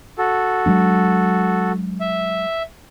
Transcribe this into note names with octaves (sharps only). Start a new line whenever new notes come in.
F#4 A4
F#3 G#3 D4
E5